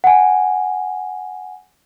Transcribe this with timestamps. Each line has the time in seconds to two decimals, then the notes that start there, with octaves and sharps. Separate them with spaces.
0.04 F#5 G#5